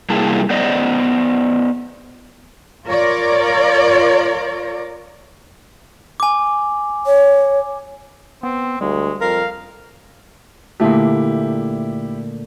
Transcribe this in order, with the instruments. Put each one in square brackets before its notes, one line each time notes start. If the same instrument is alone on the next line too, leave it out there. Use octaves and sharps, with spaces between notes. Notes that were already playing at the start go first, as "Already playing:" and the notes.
[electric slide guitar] C3 G3 A#3 E4 G#4 A5
B3 C5 D5 D#5
[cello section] F4 A#4 C#5 D5
[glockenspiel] G#5 D6
[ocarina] C#5
[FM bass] B3 [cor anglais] C4
[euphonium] D2 [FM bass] G3 [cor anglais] G#3
[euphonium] F2 [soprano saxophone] A#4 [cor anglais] F5
[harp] A#2 D3 A3 [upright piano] E4 G4